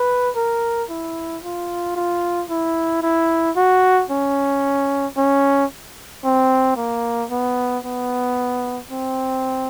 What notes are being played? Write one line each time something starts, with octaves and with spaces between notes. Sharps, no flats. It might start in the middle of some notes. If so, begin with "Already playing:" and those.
Already playing: B4
A#4
E4
F4
F4
E4
E4
F#4
C#4
C#4
C4
A#3
B3
B3
C4